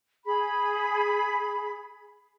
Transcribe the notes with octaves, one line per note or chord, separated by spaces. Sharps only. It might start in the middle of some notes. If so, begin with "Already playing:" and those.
G#4 B5